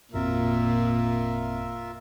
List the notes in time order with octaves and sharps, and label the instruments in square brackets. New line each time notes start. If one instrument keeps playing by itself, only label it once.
[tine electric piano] G#1 F2 C4 [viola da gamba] A#2 [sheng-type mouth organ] F4 A#4 E5